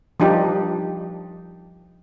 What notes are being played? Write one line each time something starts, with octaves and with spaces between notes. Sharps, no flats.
F3 G3 D4 D#4 G4